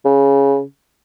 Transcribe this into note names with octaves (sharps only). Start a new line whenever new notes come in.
C#3